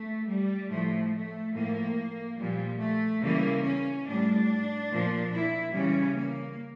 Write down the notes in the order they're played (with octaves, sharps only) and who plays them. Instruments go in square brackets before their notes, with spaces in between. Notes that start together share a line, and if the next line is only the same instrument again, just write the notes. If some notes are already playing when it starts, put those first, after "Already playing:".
Already playing: [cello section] A3
G3
A2 F3 A3
A3
A2 F3 A#3
A#2 F3 G3
A3
C#3 E3 G3 A#3
C#4
A2 G3 D4
A#2 F3
E4
C#3 E3 G3 C#4
A#3